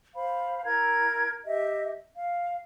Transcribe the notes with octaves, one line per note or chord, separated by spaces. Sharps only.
C5 F5 B5
E4 A#4 A#5 G#6
G4 D#5 E5
F5